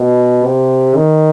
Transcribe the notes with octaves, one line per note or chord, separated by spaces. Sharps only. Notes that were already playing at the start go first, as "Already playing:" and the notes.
Already playing: B2
C3
D#3